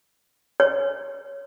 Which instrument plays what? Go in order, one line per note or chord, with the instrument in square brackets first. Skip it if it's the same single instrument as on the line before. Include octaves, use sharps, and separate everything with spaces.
[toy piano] C#5